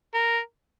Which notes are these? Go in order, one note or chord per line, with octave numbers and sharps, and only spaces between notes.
A#4